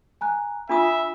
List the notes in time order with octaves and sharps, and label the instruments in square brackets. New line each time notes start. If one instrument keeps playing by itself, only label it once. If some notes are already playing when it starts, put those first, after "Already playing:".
[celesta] G#5 A#5 F#6
[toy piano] D4 F4 D#6 [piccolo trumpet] E5 [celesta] B5